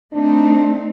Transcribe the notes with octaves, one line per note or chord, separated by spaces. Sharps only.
A3 C4 D4 D#4